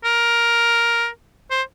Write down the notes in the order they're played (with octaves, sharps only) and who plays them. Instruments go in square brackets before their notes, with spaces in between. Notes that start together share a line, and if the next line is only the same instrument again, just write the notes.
[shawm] A#4
C5